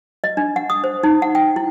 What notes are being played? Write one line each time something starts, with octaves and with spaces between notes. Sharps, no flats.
D#5
D4
F#5
D#6
C5
D#4
F#5
G5
E4